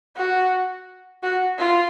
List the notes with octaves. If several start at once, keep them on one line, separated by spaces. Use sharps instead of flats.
F#4
F#4
F4